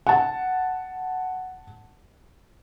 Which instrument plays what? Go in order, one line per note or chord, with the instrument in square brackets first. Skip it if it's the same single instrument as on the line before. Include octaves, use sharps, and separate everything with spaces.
[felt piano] F#5 A5